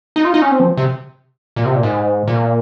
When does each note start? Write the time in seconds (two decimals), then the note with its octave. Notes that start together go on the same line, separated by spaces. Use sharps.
0.16 D#4
0.25 F4
0.34 D#4
0.42 C#4
0.51 C4
0.60 F3
0.77 C3
1.56 A#2
1.65 C3
1.75 A#2
1.83 G#2
2.28 A#2